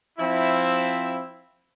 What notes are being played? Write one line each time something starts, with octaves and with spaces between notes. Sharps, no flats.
F3 C4 E4